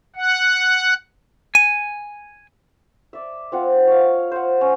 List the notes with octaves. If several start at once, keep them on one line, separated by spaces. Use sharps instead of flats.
F#5
G#5
D5 E5
C4 F4 F#5
C#5 F5
C5 F#5
C#4